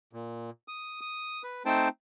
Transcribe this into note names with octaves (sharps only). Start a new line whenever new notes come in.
A#2
D#6
D#6
B4
A3 C4 D#4 C5 G5 A5